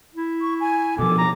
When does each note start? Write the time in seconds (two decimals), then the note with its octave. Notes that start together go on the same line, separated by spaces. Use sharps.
0.15 E4
0.41 C#6
0.60 G#5
0.99 B2 F3 A4 D6
1.18 A#5